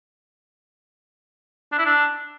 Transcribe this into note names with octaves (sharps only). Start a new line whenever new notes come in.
D4
E4
D4